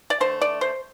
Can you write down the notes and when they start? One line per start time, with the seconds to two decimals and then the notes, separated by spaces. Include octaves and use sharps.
0.10 D5
0.20 D3 A3 C5
0.41 D5
0.61 C5